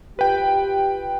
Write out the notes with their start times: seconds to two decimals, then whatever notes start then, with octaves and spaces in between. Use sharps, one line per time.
0.19 F4 G4 B4 G5